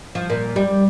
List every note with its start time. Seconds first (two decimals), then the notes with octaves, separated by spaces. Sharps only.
0.15 F3
0.30 A#2
0.56 G3